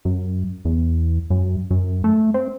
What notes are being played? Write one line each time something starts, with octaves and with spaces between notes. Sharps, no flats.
F#2
E2
F#2
F#2
A3
C4